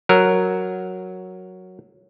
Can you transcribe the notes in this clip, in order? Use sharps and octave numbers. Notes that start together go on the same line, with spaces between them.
F#3 A#4